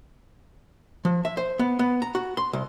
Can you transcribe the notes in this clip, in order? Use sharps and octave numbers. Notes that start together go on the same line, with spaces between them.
F3
E5
C5
B3
B3
A#5
F#4
C6
C2